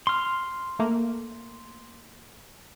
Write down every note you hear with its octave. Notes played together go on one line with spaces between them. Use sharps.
C6 F6
A3 A#3